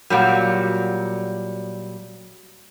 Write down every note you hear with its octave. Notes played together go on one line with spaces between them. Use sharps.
A#2 F#3 G3